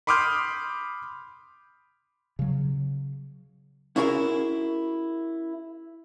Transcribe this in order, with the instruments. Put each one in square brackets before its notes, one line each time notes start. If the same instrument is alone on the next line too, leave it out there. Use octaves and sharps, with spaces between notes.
[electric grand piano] B5 C6 D6 D#6 F6 G6
[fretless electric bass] C#3 F#3
[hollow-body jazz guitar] C#4 E4 F#4 G#4 A#4 E5